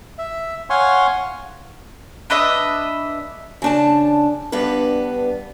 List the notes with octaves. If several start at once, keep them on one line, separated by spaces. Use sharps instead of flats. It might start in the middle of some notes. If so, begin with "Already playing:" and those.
E5
C#5 F5 F#5 G#5 C6 C#6
D4 B4 D#5 E5
C#3 D4 A5
G2 B3 D4 B4